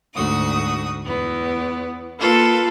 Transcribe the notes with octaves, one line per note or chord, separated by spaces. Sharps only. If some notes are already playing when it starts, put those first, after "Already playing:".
D2 G#2 F#4 D#6
E2 B3
A#3 F4 A4 B4